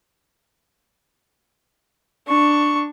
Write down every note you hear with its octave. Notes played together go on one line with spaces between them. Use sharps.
D4 C#6